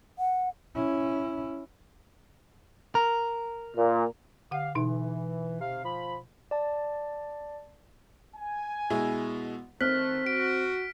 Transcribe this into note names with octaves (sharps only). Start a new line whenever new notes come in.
F#5
C#4 E4
A#4
A#2
D3 G4 F5 F#5
B2 E3 D#4
C3 F5
F3 B5
D5 A5
G#5
B2 G#3 E4
D#3 A3 C4 F6 F#6 B6
F#4 D7